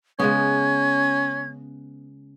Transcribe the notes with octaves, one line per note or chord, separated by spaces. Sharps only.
C#3 G#3 B3 C#4 G#6